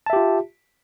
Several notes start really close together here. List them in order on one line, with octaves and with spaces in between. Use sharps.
A5 E5 G4 F4